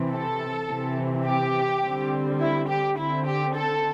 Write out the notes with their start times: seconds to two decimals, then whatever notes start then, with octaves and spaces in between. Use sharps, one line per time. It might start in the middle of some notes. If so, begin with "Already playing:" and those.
Already playing: C3 E3 C4
0.11 A4
0.69 C3 E3 C4
1.25 G4
1.83 D3 G3 C4
2.40 E4
2.68 G4
2.97 D3 C4 E4
3.26 G4
3.55 A4